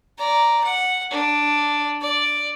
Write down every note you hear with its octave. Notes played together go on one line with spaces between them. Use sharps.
D5 A#5
F#5
D4
D5